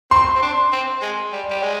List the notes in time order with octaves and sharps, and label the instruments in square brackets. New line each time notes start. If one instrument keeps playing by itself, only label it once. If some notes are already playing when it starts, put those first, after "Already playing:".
[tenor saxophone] C4 [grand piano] C6
[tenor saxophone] C4
D4
C4
G#3
G3
G3
G#3